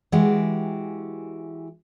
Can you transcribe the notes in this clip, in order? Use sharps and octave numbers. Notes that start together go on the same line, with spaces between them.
E3 G#3 F#4 G4